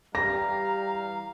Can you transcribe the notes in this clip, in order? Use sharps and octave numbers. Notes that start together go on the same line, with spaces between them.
E3 G3 F5 A#5 A#6